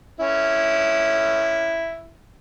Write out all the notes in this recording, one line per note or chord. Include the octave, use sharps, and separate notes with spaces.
C#4 E4